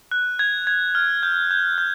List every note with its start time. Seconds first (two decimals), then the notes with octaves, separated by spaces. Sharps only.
0.11 F#6
0.39 G#6
0.67 G#6
0.95 F6
1.23 G6
1.51 G6
1.78 G6